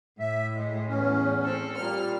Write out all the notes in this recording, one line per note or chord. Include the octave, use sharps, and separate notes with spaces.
A2 E5
G#3
E2 C#4
C4 A4
A#2 G3 A#3 F6